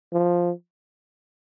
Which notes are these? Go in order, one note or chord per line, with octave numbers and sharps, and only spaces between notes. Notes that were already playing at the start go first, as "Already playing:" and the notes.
F3